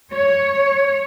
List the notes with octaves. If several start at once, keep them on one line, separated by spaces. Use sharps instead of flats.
C#5